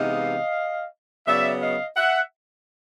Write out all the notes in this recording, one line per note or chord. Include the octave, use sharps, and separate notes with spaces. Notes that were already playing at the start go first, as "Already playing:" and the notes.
Already playing: C3 E3 G#3 B3 D#4 D#5 F5
C#3 F#3 B3 D5 E5
D#5 F5
E5 F#5